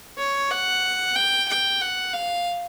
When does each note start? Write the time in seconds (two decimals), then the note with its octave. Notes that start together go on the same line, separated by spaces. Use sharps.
0.18 C#5
0.51 F#5
1.16 G5
1.49 G5
1.81 F#5
2.13 F5